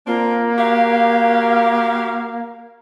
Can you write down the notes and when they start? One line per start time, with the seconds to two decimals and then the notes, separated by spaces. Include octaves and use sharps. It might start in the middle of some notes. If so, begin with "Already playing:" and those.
0.07 A#3 C4 D4 F4
0.58 F#4 G4 F5